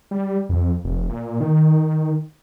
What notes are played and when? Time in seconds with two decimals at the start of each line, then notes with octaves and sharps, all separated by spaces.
0.11 G3
0.49 F2
0.85 F1
1.09 A#2
1.40 D#3